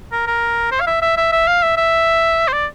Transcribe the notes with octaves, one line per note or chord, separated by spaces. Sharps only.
A#4
A#4
C5
F5
E5
E5
E5
E5
F5
E5
E5
C5
D5